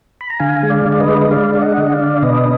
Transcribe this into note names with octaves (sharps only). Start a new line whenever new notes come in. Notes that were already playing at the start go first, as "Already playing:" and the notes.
B5
A#5
D3 F5 G#5
G#3
D5 F5
D3
F5
B4 D#5
G#3
D#5
G#3 D5 F5
D4 F5
D#5 F#5
D3
D5 F5
D4
B2 B4 D#5